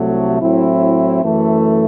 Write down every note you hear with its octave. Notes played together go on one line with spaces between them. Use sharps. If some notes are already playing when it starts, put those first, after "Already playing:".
Already playing: C2 C3 F#3 A3
A2 F#3 C4 E4
F#2 E3 A3